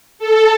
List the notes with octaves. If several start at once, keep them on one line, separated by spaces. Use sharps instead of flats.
A4